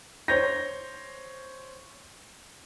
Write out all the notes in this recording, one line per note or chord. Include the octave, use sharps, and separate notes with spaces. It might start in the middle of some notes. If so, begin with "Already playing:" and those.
C5 C#5 G6 A#6